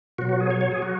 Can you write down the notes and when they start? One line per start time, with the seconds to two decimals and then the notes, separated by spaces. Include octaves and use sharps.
0.18 B2 F#4
0.22 F#3
0.29 F#4
0.40 G#4
0.50 C#5
0.61 C#5
0.71 G#4
0.82 F#3 F#4